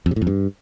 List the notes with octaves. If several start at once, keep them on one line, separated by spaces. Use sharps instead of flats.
F2
C3
A2
F2
G2